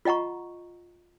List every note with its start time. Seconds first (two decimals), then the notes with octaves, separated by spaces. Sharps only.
0.05 F4 D#5 F#5 A#5 C#6